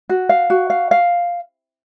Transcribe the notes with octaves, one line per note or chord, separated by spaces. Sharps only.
F#4
F5
F#4
F5
F5